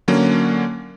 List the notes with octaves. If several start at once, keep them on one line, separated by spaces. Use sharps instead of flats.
D3 F#3 A#3 C#4